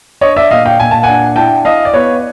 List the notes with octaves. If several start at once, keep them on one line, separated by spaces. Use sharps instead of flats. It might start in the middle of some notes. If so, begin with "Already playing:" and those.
D4 C#5 D#5
D5 E5
A#2 D#5 F5
F5 G5
A#2 G#5
A5
D4 F#5 G#5
E4 G5 A5
E4 D#5 F5
D5
B3 B4 C#5